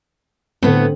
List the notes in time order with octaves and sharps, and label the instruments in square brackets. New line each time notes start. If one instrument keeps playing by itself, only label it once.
[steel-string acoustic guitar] A2 B3 [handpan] D3 C4